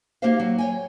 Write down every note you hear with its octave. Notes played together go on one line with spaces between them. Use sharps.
A#3 D#4 F#4 G4 C5 F5
F#3
C#5 G5 G#5